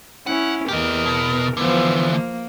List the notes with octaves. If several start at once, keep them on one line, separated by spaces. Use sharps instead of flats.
C#4 E4 F#5
E2 G4 A#4 D#5
B2
D3 E3 F3 B3
A#3